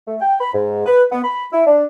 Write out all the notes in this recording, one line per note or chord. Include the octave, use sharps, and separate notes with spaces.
A3
G5
B5
G#2
B4
B3
B5
E4
D4